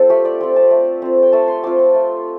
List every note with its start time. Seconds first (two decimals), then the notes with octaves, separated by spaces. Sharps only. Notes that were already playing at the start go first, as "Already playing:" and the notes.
Already playing: C4 F4 A4 C5
0.10 A3 G4
0.25 D5
0.41 C4 F4
0.56 A5
0.71 A3
1.02 C4 F4
1.23 G5
1.32 A3 A5
1.48 C6
1.63 C4 F4 D6
1.79 C6
1.94 A3